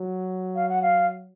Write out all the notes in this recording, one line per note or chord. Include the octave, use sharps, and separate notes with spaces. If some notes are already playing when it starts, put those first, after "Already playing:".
Already playing: F#3
F5
F#5
F5